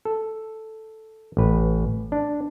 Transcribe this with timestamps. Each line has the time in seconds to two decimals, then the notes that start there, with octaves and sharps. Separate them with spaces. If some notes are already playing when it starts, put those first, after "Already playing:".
0.05 A4
1.37 A1 B4
2.12 D4